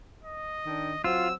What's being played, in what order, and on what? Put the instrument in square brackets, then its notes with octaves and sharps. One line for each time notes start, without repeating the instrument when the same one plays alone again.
[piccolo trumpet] D#5
[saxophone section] D#3 D4
[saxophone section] F#3 C4 C5 [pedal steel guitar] F4 [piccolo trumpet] E6